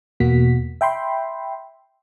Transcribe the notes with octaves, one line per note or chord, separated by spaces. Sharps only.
E2 B2 A#3 F#4 B6
E5 G5 B5 C6